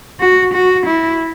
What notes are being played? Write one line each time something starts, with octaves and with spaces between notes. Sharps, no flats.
F#4
F#4
E4